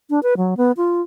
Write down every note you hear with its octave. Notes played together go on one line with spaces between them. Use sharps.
D4
B4
F#3
B3
F4